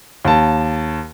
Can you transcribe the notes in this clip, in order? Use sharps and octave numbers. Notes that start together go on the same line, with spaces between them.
D#2 A5